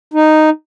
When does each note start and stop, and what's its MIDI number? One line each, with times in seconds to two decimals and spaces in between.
0.14 0.50 63